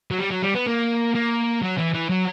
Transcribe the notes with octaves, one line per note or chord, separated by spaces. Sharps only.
F#3
G3
F#3
G3
B3
A#3
A#3
F#3
E3
E3
F#3